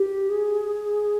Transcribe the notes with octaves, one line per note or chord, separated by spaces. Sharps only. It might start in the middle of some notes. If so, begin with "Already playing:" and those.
Already playing: G4
G#4